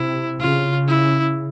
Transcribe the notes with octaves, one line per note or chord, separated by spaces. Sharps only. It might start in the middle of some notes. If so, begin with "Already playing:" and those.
Already playing: C3 E4
C#3 F4
E4